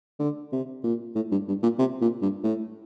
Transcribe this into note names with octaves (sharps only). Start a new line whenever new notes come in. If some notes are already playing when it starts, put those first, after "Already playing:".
D3
C3
A#2
A2
G2
G2
A#2
C3
A#2
G2
A2